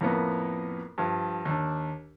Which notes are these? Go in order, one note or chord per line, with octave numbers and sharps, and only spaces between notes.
F2 A2 A#3 B3
G2 F3
D#2 D4